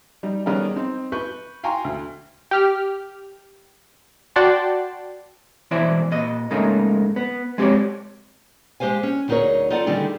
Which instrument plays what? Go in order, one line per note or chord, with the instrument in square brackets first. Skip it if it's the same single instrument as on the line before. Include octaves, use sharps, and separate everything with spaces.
[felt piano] G3 D#4
D#3 G3 B3 C#4 G#4 A#4
C4 D#4
B4 C#6 G6
F5 G5 G#5 A#5 C6 C#6
D2
[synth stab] G4 F6
F#4 D5 F#5 G5 A5 C6
[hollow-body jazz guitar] B2 E3 E4 C5 D5 E5
A#2 D#5
G#2 C#3 A3 A#3 D#4
B3
G#3 C4 G4 B4 C#5 D5
[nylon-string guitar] G#3 G4 C5 F5 G#5
C#4
D2 F#3 D#4 G#4 A#4 C#5
D#4 F4 A4 D5 F#5
D3 D#3 G3 A3 D#4 G#4